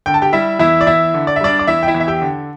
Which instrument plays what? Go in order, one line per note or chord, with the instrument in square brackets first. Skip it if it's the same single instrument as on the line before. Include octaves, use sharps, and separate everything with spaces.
[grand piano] D3 G5
A5
G4 G5
G3 E4 E5
E2 E4 E5
D5
E2 E4 E5
D3
D5
E5
G3 D4 D5
D5
E2 E4 E5
G5
E4 E5
E2
E5
G4 G5
D3